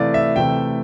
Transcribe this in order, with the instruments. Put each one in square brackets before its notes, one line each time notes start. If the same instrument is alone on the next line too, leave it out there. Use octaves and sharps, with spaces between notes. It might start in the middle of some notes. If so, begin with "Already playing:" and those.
Already playing: [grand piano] C3 E3 A3 D5 F5
E5
C3 E3 A3 G5